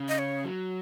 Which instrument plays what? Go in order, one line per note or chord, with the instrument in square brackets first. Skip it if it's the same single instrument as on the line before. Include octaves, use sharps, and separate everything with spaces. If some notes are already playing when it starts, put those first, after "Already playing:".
Already playing: [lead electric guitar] C#3
[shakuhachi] D#5
C#5
[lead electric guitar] F#3